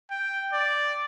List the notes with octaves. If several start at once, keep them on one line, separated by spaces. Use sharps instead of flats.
G5
D5